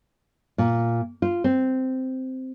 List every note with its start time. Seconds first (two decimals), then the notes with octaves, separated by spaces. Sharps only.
0.58 A#2
1.22 F4
1.44 C4